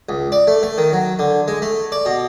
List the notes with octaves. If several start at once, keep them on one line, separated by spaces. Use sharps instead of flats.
C#2
D5
A3
A3
D#3
F#3
D3
G#3
A3
D5
B2